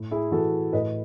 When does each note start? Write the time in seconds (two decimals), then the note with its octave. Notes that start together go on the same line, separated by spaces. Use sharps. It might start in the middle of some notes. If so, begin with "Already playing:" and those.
Already playing: A2
0.11 E4 G#4
0.31 E3 F#4 A4
0.73 A2 B4 D#5